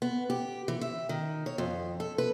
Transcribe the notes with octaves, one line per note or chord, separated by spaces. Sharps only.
B3
G4
E3
E5
D#3
C#5
F2
A4
B4